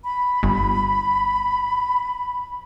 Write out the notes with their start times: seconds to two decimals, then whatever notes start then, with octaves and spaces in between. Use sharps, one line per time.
0.04 B5
0.43 G1